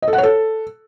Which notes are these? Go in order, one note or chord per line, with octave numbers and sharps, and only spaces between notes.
D#5
A4
F#5
C#5
A4